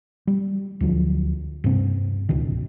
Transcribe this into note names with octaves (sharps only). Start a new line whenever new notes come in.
G3
D2 F3 F#3
G2 C3 C4
D1 C#2 B2 D#3